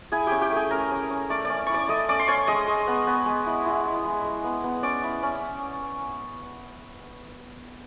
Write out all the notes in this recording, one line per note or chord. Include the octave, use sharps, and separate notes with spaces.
E4 G#4 G#5
C#4 G4 G5
G4 G5
A3 G#4 G#5
C#4 A#4 A#5
C#4
C#4
A3 D5 D6
C#4 D5 D6
E4 C#6
D5 D6
A3 D#5 D#6
C#4 D5 D6
C6
C#4 C#5 C#6
G#3 D#5 D#6
G#3
B3
B3
G#3
E4
E4
G#3
G#3
G#3
B3
B3
C#4 D5 D6
E4
C#4